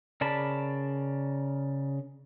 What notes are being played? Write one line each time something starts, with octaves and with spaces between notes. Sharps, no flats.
C#3 A#4 D5 A5 B5